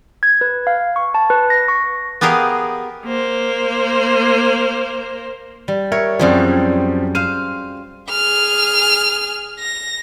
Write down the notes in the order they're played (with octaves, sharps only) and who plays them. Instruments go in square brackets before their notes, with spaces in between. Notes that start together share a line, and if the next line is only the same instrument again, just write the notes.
[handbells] G#6
B4
F5
C#6
A5
B4
A#6
C#6
[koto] B3 G4 G#4 A#4 D#5 F5
[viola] A#3 C5
[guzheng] G3
[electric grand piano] A#4 E5 [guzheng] C#5
[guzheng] F#2 G3 G#4 [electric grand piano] F3 C4
[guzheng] C5 F5 [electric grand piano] D#7
[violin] G#4 F6
A#6